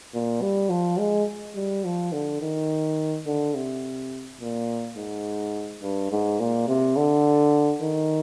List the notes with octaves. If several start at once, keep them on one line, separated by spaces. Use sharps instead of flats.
A#2
G3
F3
G#3
G3
F3
D3
D#3
D3
C3
A#2
G#2
G2
G#2
A#2
C3
D3
D#3